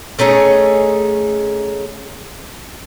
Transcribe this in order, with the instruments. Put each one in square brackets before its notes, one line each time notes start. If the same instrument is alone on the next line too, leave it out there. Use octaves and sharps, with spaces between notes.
[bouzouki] A3 C#4 D#4 G#4